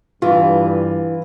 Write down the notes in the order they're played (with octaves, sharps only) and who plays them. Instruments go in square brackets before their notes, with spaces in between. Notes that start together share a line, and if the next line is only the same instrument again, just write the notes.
[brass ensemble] G2 [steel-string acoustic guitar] E3 [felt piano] F4